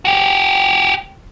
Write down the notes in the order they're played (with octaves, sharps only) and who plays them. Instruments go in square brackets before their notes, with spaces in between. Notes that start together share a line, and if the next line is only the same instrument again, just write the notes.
[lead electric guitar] F#4 G4